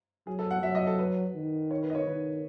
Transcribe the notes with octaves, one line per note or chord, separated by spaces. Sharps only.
F#3 G#4
A4
F#5
F#3 E5
D#5
A4
B4
D#3
C#5
B4
D#5
C#5
D#3 B4